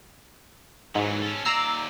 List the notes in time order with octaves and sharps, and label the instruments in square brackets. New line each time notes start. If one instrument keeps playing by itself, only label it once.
[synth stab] G#2 [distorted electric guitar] E3 F#3
[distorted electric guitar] C#4 A4
[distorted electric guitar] D#2 D5 [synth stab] A#5 E6 C7